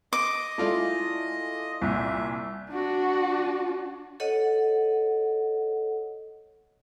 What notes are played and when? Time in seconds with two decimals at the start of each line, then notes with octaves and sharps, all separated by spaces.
0.13 D#5 D6
0.58 G#3 A3 E4 F4 D5
1.82 C2 A#2 E5
2.70 D4 F#4
4.20 A4 C#5 D#5 F#5